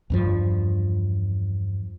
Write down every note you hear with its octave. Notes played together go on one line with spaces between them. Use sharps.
E2 G2 F3